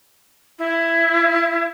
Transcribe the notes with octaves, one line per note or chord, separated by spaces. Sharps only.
E4